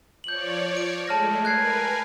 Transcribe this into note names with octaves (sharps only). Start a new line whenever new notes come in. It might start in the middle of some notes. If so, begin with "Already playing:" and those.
F3 C#5 D5 G6 F#7
D7
G#3 A3 A5 F6 A#6
A#4 B4 G#5 F#6 G#6 C7